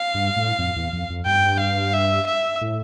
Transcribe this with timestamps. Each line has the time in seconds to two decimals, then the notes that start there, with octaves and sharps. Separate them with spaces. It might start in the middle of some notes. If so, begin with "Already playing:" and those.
Already playing: F5
0.14 G2
0.36 A2
0.59 F2
0.76 E2
0.93 F2
1.10 F2
1.26 G2 G5
1.60 F5
1.93 E5
2.27 E5
2.61 A2